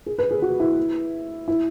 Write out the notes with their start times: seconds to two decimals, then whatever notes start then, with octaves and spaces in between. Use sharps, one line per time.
0.06 G#4
0.18 B4
0.31 G#4
0.42 F#4
0.60 E4
1.48 E4